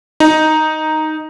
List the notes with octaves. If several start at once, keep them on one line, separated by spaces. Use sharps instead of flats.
D#4